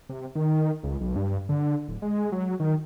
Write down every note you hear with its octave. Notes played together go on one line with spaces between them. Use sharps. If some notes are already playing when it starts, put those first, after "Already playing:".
C3
D#3
C#2
B1
G2
D3
D1
G#3
F#3
D#3